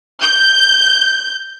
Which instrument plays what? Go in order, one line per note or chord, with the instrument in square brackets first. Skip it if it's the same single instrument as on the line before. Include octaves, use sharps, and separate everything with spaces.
[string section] G6